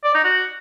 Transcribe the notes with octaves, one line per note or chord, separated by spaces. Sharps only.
D5
D#4
F#4